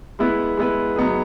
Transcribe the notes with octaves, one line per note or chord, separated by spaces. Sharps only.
G#3 B3 E4 B4
G#3 B3 E4 B4
F#3 B3 D#4 G#4